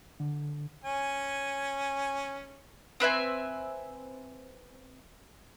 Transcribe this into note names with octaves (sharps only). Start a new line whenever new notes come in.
D3
C#4 G#5
C4 B4 E5 G#5